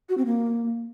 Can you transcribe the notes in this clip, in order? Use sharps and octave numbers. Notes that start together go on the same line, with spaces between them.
F#4
C4
A#3